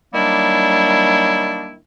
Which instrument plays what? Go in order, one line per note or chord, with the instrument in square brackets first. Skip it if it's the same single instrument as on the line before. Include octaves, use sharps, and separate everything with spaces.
[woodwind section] D#3 F#3 G3 A#3 D4 E4